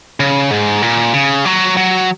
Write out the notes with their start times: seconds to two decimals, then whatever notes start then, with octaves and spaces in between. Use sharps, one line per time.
0.20 C#3
0.51 G#2
0.82 A#2
1.14 C#3
1.45 F#3
1.77 F#3